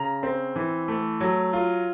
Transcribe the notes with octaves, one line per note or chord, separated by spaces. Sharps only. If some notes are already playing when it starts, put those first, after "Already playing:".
Already playing: C#3 A#5
C4
E3
A3
F#3
F4